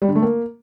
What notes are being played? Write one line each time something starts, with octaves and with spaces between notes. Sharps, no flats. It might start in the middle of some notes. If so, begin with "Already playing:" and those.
G3
D3
A3
A#3